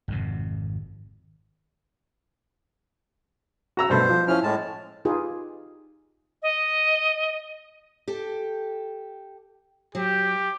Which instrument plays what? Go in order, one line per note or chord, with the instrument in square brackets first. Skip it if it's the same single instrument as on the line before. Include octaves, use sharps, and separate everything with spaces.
[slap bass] G#1 F2 C3
[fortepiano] F#4 A#5 E6
[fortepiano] G2 B2 A3 [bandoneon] C5
[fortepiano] F3
[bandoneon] F3 C#4 F6 [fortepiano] E4
[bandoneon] A2 G#3 A5
[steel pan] D#4 F4 G4 G#4 B4
[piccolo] D#5
[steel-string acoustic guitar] G4 A4
[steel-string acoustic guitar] F#3 [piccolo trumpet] G4